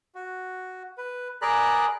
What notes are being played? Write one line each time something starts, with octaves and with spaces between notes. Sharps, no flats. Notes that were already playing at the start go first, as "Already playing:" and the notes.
F#4
B4
G#4 A#4 D5 A#5 B5 F#6